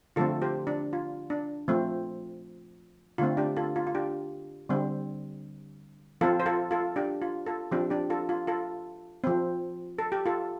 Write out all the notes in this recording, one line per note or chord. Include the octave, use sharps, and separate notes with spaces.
D3 F3 A3 C4 F4 A4
G4 C5
D4
F4
D4
F3 A3 C4
D3 A3 C4 F4
D4 G4
F4 A4
F4
F4
D4 G4
D3 G3 C4
F3 C4 F4 A4
C5
F4 A4
F4 A4
D4 G4
F4
F4 A4
F3 C4 D4 G4
D4 G4
F4 A4
F4
F4 A4
F3 C4
A4
G4
F4 A4